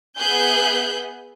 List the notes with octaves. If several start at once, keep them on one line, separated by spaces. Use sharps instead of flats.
B3 G#4 E5 G#5 F#6 G6